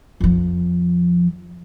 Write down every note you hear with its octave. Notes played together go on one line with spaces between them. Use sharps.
F2 F3